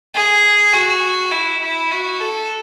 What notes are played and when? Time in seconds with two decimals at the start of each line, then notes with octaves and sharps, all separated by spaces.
0.14 G#4
0.73 F#4
1.31 E4
1.61 E4
1.91 F#4
2.20 A4